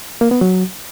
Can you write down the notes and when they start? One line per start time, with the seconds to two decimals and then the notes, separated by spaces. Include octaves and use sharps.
0.21 A#3
0.31 B3
0.41 F#3